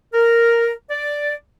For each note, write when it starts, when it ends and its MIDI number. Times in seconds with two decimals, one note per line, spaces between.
0.13 0.71 70
0.89 1.32 74